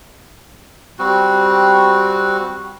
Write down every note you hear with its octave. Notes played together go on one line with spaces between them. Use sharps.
G3 C4 F#4